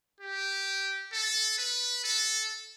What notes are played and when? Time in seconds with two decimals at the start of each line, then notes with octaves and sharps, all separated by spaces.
0.21 G4
1.13 A4
1.59 B4
2.05 A4